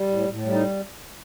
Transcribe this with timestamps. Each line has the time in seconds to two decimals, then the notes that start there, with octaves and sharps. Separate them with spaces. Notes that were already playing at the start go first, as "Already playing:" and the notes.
Already playing: G3
0.11 A2
0.29 A2
0.46 G3
0.52 D#4